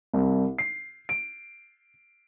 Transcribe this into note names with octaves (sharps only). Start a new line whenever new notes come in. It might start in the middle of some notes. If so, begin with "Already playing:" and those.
C2
C7
D7